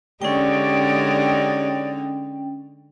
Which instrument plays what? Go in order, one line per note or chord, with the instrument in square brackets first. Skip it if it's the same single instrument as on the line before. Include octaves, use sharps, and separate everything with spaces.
[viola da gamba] D3 G#3 D#4 [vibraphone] C#4 G5 [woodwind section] G4 C#5 D5